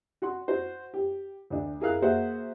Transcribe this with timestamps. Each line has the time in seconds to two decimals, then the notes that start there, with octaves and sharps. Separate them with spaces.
0.22 F#4 F#5 C6
0.48 F#4 C5
0.94 G4
1.50 D2 D4
1.80 E4 G#4 A#4 F5 F#6
2.02 A#3 F#4 G#4 C5 E5 F#5